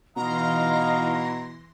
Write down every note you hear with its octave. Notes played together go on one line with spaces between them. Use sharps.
B2 E3 D#4 D#5 F5 A#5 C6 A#6